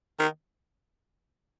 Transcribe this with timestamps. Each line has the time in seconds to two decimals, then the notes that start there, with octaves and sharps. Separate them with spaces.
0.19 D#3